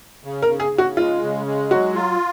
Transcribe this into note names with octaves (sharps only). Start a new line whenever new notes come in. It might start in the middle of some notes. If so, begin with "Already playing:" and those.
C#3
A#4
C#3
G#4
C#3
F#4
G#3 F4
C#3
G#3
F#3 F#4
F4